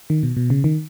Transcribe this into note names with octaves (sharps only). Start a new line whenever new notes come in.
D#3
B2
B2
C#3
D#3